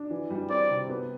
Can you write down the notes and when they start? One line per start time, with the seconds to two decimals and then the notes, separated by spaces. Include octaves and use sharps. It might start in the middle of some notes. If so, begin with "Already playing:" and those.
Already playing: D4
0.10 E3
0.30 G3
0.50 C4 D5
0.70 C3
0.89 B3